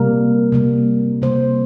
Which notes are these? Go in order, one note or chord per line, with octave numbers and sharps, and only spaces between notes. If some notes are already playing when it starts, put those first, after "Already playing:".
Already playing: C3 G3 A#3 A#4
C3 G3 A#3
C3 G3 A#3 C5